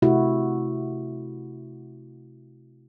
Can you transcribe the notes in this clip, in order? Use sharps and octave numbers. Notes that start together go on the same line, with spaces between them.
C3 A3 E4 F#4